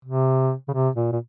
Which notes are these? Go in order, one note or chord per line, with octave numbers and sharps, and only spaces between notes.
C3
C#3
C3
A#2
A#2